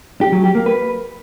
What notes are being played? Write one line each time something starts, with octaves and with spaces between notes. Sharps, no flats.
G4
F#3
G4
A#3
B4